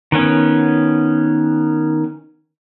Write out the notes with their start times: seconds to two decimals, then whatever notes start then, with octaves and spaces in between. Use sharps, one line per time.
0.12 D#3 B3 C#4